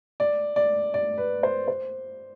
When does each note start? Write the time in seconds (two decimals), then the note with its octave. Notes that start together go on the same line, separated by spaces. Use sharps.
0.20 D5
0.56 D5
0.94 D5
1.18 B4
1.43 C5
1.68 C5